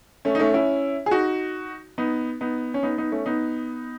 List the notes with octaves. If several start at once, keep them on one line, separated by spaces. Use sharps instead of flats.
A3 C#4
D#4
A3 C#4
C#4 E4
G#4
D#4 F#4
B3 D#4
B3 D#4
C#4
B3 D#4
B3 D#4
A3 C#4
B3 D#4